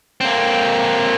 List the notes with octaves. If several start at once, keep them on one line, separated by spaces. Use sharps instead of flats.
A#3 C4